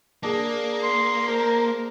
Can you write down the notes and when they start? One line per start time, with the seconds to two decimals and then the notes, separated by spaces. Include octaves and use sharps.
0.23 A#3 D4 G#4
0.83 C6
1.28 A#4 C5